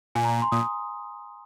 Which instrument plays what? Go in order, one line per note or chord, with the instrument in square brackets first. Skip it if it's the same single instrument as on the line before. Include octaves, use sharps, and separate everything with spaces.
[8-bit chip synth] A#2 [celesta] G#5
[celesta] A#5
C6
[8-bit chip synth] A#2 [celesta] D#6